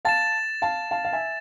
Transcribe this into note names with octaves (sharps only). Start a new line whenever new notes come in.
F5 A5 A6 E7
F5 A5
F5 A5
F5
E5 G#5